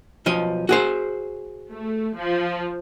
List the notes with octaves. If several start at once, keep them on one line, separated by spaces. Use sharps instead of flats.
B1 F3 D#5
F#4 G#4 C5
A3
F3